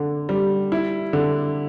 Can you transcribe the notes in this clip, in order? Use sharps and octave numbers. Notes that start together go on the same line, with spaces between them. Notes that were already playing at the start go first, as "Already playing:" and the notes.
Already playing: D3
G3
E4
D3